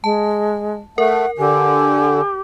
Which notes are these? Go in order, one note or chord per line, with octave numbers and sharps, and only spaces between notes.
G#3 A5
A3 A#4 F#5
D3 G4 G#5